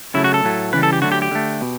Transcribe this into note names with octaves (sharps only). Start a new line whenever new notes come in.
C#3 F#3 A3 E4
F#4
A4
A2 F#3 A3
C#3 E3 G3 B4
A4
G4
D3 F#3 A3 F#4
G4
G4
D3 A3
B2